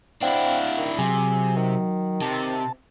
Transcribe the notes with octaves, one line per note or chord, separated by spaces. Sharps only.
C4 D4 E4 F5 F#5
D#3
C3 F#3 G#4
D#3
C3 A5